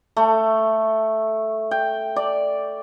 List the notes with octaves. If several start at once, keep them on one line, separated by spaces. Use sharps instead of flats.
A3
G5
D5